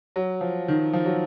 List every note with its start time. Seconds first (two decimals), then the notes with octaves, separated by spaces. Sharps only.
0.16 F#3
0.41 F3
0.68 D#3
0.93 F3
1.06 F#3